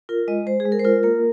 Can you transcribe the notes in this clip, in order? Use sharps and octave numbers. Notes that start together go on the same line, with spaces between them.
F4 A#4
G#3 D#5
G#3 C5
G#4
G#3
A#4
C5
F4 A#4
A#3 A#4